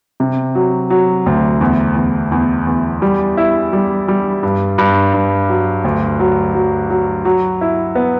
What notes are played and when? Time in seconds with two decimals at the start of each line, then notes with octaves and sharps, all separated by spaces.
0.20 C3
0.55 F#3
0.90 F#3
1.26 D2
1.61 E2
1.96 E2
2.32 E2
2.67 E2
3.02 G3
3.37 E4
3.73 G3
4.08 G3
4.43 G2
4.78 G2
5.14 G2
5.49 F#3
5.84 D2
6.20 F#3
6.54 F#3
6.90 F#3
7.25 F#3
7.61 E4
7.95 B3